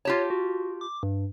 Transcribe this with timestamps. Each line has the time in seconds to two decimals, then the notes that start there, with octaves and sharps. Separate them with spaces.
0.05 F4 G4 C#5 A5
0.30 F#4
0.81 D6
1.03 G2